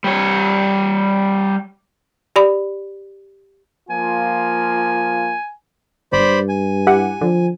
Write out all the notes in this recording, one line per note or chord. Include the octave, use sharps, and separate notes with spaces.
G3 C#5
G4 D5 B5
F3 A#3 F4 G#5
G1 G2 C5 D5 B5
G#5
E4 G4 F#5
D3 F3